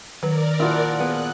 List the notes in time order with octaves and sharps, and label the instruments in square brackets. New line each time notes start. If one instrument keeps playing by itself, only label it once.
[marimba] D#3 B4 [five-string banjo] F#3 [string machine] A#4 D5
[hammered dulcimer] A#2 F3 F#5 [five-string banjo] E4 F#4
[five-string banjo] B3 G#4 [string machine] F#6